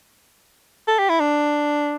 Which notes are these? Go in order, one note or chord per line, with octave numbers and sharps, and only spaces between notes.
A4
G4
E4
D4